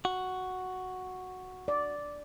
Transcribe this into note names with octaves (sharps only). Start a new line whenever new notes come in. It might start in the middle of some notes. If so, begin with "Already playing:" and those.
F#4
D5